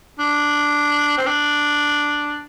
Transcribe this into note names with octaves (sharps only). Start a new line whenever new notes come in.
D4
C4
D4